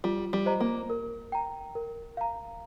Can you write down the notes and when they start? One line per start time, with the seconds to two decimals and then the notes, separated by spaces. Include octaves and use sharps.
0.04 G3 F4
0.33 G3
0.46 C5 D#5 A#5
0.60 A#3
0.90 A#4
1.32 G5 A#5
1.75 A#4
2.17 F5 A#5